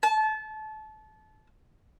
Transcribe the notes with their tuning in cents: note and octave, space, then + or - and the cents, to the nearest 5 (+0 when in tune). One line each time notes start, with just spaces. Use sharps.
A5 -25